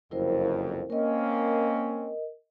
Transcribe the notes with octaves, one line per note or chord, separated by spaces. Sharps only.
F#1 C2 F2 E4 A#4 C5
A#3 C4 C#4 A#4 D#5